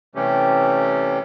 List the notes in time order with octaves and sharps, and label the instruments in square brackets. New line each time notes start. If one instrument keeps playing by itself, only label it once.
[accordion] C3 E3 G3 A3 C#4 G4